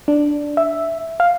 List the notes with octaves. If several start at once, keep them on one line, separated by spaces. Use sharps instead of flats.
D4
E5
F5